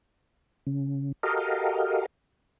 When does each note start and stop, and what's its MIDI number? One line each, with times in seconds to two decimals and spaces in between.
0.67 1.12 49
1.23 2.06 66
1.23 2.06 67
1.23 2.06 69
1.23 2.06 70
1.23 2.06 75
1.23 2.06 77